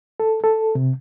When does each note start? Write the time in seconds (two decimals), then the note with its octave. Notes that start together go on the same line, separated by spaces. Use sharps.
0.20 A4
0.44 A4
0.75 C3